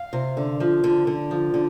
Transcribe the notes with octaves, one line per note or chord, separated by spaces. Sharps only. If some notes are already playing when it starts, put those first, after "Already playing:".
Already playing: F5
C3
D3
F3
D3
D3
F3
D3